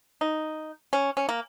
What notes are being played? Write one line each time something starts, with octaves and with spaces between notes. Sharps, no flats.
D#4
C#4
C#4
A#3